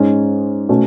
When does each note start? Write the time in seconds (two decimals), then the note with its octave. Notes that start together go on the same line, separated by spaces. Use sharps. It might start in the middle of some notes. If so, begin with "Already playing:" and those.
Already playing: G#2 G#3 C#4
0.69 B2 A3 C#4